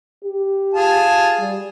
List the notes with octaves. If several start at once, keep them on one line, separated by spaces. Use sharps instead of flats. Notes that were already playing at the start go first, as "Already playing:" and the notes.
G4
F4 G#4 A5
G3